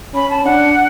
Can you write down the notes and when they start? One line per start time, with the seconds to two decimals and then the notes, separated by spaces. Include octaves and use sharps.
0.14 C#4 B5
0.30 A5
0.45 D4 F#5